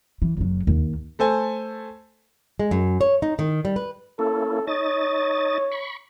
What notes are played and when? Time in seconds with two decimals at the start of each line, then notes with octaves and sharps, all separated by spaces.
0.22 E3
0.37 F#1 F#3
0.67 D#2
1.19 A3 A4 C5 G#5
2.59 G#3
2.71 F#2
3.01 C#5
3.22 D#4
3.39 D#3
3.65 G3
3.76 B4
4.19 A#3 C#4 E4 A4
4.67 D#4 C#5 D#5 A6
5.72 B5 C#6